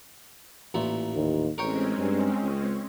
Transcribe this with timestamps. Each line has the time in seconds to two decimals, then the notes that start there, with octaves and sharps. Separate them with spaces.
0.74 A1 A#2 E4
1.15 D#2
1.58 A1 G#3 C4 C#4 A#4 C#5 G5
1.98 G2
2.42 C#2